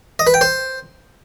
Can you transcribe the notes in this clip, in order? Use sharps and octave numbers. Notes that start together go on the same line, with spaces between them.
D#5
B4
G5
C5